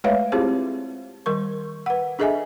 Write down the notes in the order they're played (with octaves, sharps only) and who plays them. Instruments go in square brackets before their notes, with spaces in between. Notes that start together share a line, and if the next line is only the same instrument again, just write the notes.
[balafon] G#3 A3 B4 C#5 E5 F5
C4 E4 F4 G4 G#4 C5
D#3 G3 A#4 C#6
B4 F#5
D4 G#4 A4 D#5 E5 G#5